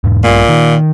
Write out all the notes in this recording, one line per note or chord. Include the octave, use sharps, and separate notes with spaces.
E2 G#2
A#1 G2 A#2 A#3
D#3